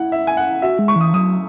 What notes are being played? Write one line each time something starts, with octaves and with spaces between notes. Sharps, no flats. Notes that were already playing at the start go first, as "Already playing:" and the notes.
Already playing: E4 F#5
E5
G#5
F#5
F#4 E5
G#3
C#6
E3 D#6
F#3 D#6